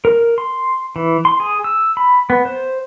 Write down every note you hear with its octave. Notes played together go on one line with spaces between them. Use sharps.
A#4
C6
E3
C6
G#4
E6
B5
B3
C5